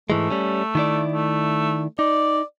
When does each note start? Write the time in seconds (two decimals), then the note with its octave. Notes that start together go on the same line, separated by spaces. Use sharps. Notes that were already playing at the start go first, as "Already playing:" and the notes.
0.10 G#2 E3 G#3 A3
0.30 G3 C#4
0.75 D#3 E4 D5
1.12 A3
1.99 D#4 D5